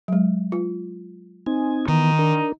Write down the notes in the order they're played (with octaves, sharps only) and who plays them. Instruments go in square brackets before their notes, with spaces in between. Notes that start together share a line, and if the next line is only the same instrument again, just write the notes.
[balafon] F#3 G#3
F4
[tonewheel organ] C4 D#4 G#5
[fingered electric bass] D#3 [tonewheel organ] E3 B3 [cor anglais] D#4
[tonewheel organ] D4 A#4